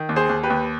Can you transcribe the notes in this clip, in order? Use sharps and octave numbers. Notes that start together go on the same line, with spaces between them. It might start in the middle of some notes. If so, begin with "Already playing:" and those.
Already playing: D#3
D#2
G#4 C5
D#2
G4 B4
D#2